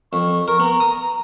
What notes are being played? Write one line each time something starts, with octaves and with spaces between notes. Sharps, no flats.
F2 C#6
A#4
B3 A#5
D#6